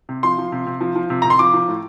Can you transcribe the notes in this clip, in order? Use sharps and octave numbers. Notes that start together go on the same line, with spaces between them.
C3
F3 C6
F3
C3
C3
F3
F3
C3
C3 A#5
C6
F3 D6
F3
A2